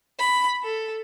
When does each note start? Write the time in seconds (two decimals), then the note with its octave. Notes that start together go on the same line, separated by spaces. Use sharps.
0.20 B5
0.64 A4